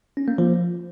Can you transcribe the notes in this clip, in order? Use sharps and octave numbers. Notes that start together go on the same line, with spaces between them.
C#4
A#3
F3